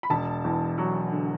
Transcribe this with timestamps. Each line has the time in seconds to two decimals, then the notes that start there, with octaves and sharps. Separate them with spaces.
0.03 B5
0.10 E1 A5
0.44 E2
0.78 F#3
1.12 D3